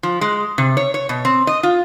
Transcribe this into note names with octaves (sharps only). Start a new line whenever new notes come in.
F3
G#3
C3
C#5
C#5
B2
C4
D#5
F4